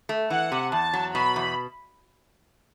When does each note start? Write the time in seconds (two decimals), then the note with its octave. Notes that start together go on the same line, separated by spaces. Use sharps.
0.09 A3
0.30 E3 F#5
0.52 C3
0.72 E2 A5
0.93 F#3
1.15 B2 B5
1.36 E2